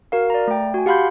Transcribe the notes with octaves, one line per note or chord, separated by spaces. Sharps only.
F#4 A#4 F5
D5 A#5
A3 G5
F#4 G#5
G4 F5 F#5 B5 C6 G6